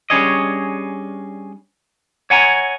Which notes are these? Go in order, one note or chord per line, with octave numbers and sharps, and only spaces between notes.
G3 C#4 D4 G#4 C#5 D#5
C#5 F#5 G#5 A#5